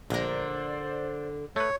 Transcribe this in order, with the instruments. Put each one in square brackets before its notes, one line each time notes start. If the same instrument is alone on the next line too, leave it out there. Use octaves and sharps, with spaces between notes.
[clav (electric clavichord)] A#1 [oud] D3 A#4 [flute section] C5 D5
[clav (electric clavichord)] A3 B4 [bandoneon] C#5